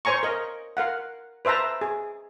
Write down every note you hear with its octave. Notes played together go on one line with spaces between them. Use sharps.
C5 C#5 G#5 A#5 C#6
A#4 D#5
A#4 F5 F#5
B4 C5 E5 A5 A#5
G#4